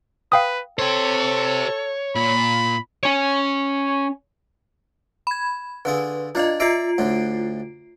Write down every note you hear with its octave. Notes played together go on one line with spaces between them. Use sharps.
B4 F5 G5 D#6
G4 A4 C5 C#5
A#2 B5
C#4 C#5
B5 G#6
D3 F4 G#4 B4
D4 F4 D5 D#5 F5
F4 D5 E5 A#5 C7 D7
D2 A2 D3